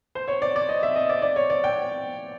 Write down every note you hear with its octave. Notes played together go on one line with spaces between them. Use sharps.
C5
C#5
D5
D5
D#5
E5
D#5
D5
D5
C#5
D5
G5